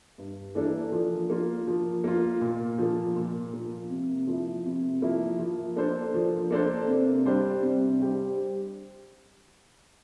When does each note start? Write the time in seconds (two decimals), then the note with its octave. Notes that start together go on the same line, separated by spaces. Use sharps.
0.18 G2
0.55 E3 A#3 D4 A4
0.92 F3
1.30 A#3 F4
1.67 F3
2.04 A#3 F4
2.41 A#2
2.78 F3 A#3
3.16 A#2
3.53 F3 A#3
3.90 C3
4.27 F3 A#3 E4
4.65 C3
5.02 F3 A#3 E4
5.39 F3
5.76 A#3 D4 A4 C5
6.14 F3
6.51 A#3 D4 A4 C5
6.88 C3
7.25 G3 D4 G4 C5
7.63 C3
8.00 G3 D4 G4 C5